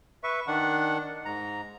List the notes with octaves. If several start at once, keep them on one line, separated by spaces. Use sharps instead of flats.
B4 E5 C#6
D#3 D4 F#5
G#2 A#5